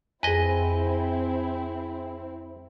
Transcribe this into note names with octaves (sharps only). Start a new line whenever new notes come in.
F2 C4 E4 G#4 B4 C5 D#5 G#5